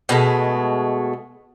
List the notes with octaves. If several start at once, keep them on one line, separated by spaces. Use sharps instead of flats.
B2 G#3 A3